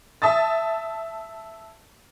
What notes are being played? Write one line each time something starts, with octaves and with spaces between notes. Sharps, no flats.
E5 A5 D#6 A6